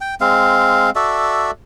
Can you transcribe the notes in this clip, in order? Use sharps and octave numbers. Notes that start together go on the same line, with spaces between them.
G5
G#3 C4 F5
F#4 A4 D5 E5